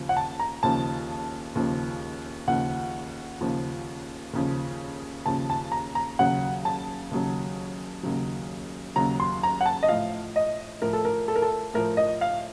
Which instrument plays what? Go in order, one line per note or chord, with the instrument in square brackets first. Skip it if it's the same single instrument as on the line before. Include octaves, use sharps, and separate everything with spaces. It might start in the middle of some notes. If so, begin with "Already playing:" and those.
Already playing: [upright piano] D#2 C#3 F3
F#5
A5
A#5
D#2 C#3 F3 A5
D#2 C#3 F3
D#2 C#3 F3 F#5
D#2 C#3 F3
D#2 C#3 F3
D#2 C#3 F3 A5
A5
A#5
A#5
D#2 C#3 F#3 F#5
A5
D#2 C#3 F#3
D#2 C#3 F#3
D#2 C#3 F#3 A#5
C6
A#5
F#5
A5
D#5
A2 F3 F5
D#5
A2 F3 A#4
A4
A#4
A4
A#4
A4
A2 F3 A#4
D#5
F5